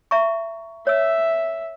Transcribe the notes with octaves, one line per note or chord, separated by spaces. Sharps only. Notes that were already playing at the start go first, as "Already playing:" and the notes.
E5 A#5 C#6
C#5 E5 E6